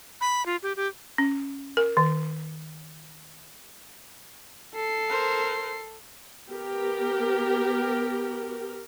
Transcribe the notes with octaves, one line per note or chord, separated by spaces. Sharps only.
B5
F4
G4
G4
C#4
A#4
D#3
A4 C7
A#4 C5
B3 G4 A#4